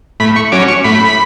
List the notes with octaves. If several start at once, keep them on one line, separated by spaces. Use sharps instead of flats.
A2 B5
C#6
F#3 C#4 D6
C#6
A2 B5